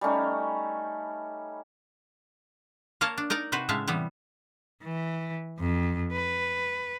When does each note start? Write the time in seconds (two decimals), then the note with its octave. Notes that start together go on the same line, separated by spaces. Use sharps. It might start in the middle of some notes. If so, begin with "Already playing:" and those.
0.01 G3 A3 C#4 D#4
3.01 A#3 A#4 C#5 F5 A5
3.18 D4
3.30 D#4 A#4 D5 A#5
3.52 C3 F#4 B4 C5
3.69 A2 C#3 G#3 E5 F5 A5
3.87 C3 E3 G3 B3
4.83 E3
5.59 F2
6.12 B4